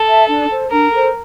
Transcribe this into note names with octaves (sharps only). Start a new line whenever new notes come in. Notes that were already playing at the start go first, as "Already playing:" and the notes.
Already playing: A4
E5 A5
D4
A4 C5
D4 A#4
A4 C5